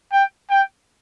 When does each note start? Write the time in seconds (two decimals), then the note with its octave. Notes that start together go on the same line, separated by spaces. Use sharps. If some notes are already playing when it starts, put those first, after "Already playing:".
0.12 G5
0.50 G5